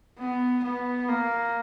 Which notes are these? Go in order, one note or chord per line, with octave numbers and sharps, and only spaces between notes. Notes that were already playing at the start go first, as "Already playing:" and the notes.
B3
B3
A#3